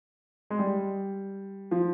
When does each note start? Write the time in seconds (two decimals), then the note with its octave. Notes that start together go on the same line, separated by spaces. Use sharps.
0.50 G#3
0.59 G3
1.71 F3